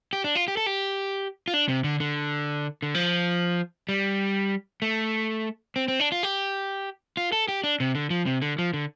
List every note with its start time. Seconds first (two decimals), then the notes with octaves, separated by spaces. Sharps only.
0.13 G4
0.24 D4
0.35 F4
0.48 G4
0.57 A4
0.66 G4
1.48 F4
1.54 D4
1.68 C3
1.84 D3
2.00 D3
2.82 D3
2.95 F3
3.89 G3
4.82 A3
5.76 C4
5.88 C4
6.00 D4
6.12 F4
6.23 G4
7.17 F4
7.32 A4
7.48 G4
7.64 D4
7.80 C3
7.95 D3
8.10 F3
8.26 C3
8.42 D3
8.59 F3
8.74 D3